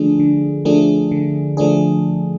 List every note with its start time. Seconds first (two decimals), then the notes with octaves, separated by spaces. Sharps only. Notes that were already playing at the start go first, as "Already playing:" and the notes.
Already playing: D3 F3 A3 D4 G#4
0.20 D3
0.65 F3 A3 D4 G#4
1.11 D3
1.57 F3 A3 D4 G#4